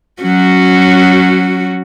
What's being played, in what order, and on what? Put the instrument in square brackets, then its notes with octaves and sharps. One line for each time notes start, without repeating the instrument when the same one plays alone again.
[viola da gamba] F#3 C#4 F#4